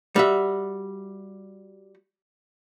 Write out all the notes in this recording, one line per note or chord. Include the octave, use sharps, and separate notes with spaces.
G3 F#4 E5